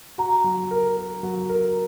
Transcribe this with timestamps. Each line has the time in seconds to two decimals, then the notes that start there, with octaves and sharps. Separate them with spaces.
0.18 F#4 A#5
0.44 F#3
0.71 A#4
0.97 A#4
1.23 F#3
1.49 A#4